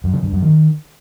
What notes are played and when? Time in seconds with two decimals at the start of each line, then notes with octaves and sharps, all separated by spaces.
0.04 F#2
0.14 C#3
0.23 G2
0.33 F#2
0.42 D#3